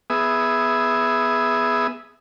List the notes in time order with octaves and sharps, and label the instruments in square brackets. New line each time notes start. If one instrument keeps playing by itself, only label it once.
[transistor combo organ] B3 G#4 E5 D#6